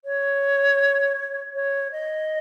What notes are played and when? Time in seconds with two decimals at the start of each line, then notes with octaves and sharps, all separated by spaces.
0.05 C#5
1.54 C#5
1.92 D#5